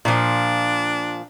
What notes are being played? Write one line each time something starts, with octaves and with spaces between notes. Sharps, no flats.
A#2 F3 D4